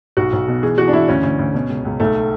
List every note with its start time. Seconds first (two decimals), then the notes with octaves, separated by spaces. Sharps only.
0.17 B1 F#4
0.32 B1
0.48 B2
0.63 E3 G#4
0.78 E3 F#4
0.88 D4
0.93 E3 E4
1.08 D2 C#4
1.23 D2
1.39 D2
1.54 B2
1.69 C#2
1.85 C#2
2.00 B1 A3